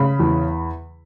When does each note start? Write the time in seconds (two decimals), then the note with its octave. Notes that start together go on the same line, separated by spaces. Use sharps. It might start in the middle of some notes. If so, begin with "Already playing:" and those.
Already playing: C#3 B5
0.19 E2